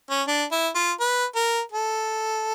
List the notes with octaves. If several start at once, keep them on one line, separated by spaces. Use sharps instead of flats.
C#4
D4
E4
F4
B4
A#4
A4